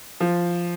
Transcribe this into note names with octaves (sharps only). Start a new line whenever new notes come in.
F3